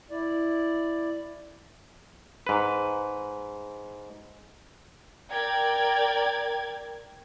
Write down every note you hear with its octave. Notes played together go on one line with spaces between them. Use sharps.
E4 D5
G#2 B4
A#4 D5 G5 G#6